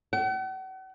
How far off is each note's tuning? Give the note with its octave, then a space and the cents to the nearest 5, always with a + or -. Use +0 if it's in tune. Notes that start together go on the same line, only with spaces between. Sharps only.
F#5 +40